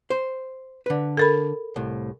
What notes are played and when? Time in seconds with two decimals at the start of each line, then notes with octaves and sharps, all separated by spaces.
0.10 C5
0.86 D3 B4
1.17 A4 A#4 B5
1.76 C2 A2